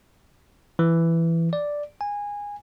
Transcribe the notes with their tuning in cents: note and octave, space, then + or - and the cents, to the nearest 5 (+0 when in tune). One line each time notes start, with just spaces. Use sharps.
E3 +10
D5 +0
G#5 -20